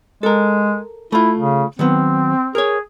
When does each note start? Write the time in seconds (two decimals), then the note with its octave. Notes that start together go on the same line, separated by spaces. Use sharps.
0.23 G#3 A4 A#4
1.12 A3 E4 F4
1.38 C#3
1.79 D#3 F#3 B3 C4
2.55 G#4 A#4 C#5